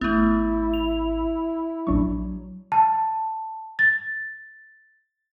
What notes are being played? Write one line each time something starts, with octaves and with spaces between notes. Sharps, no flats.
G#1 A3 B3 E4
F7
A#1 F#3 D4 C#6
A5
A6